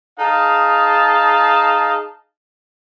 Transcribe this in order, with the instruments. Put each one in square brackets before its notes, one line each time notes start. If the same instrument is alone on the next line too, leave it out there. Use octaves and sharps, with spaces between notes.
[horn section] D#4 G#4 F5 A5